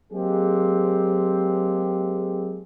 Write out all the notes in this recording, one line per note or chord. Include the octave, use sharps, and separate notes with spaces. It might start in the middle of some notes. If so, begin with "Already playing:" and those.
F#3 G#3 A#3 C4 G4 G#4